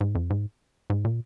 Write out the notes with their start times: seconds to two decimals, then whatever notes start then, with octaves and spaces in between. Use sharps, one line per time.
0.01 G#2
0.15 F2
0.30 G#2
0.90 G#2
1.05 A#2